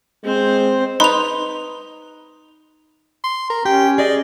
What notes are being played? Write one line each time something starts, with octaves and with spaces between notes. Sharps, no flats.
G#3 C4 C5
D#4 B4 C6 F7
C6
A#4
C#4 G4 G5
G#4 D5 D#5